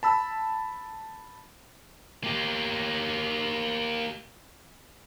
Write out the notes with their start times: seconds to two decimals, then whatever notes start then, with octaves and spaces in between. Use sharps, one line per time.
0.03 A5 B5 E6
2.24 A#3 G4